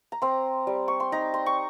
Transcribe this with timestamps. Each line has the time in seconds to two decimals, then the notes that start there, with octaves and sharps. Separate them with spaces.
0.12 A#5
0.22 C4 C6
0.67 G3
0.88 C#6
1.00 C6
1.12 D#4 A#5
1.34 C6
1.46 C#6